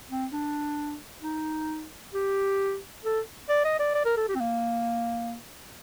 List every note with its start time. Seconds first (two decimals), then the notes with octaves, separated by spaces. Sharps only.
0.10 C4
0.33 D4
1.23 D#4
2.14 G4
3.04 A4
3.49 D5
3.65 D#5
3.80 D5
3.95 D5
4.06 A#4
4.17 A4
4.29 G4
4.36 C4
4.40 A#3